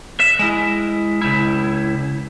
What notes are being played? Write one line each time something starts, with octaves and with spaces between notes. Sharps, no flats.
E5
G#3 E4
C#2 E4